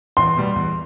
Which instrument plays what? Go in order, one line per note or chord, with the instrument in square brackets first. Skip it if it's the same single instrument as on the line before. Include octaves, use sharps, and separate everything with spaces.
[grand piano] E2 [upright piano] C6
[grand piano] B2 G3
E2